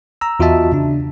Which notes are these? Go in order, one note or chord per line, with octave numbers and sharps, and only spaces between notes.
A#5 E6
E2 F4 F#4 D#5 E5 A5
C#3 D4